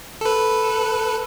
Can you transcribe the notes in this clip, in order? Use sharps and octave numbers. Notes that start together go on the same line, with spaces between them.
A4 B4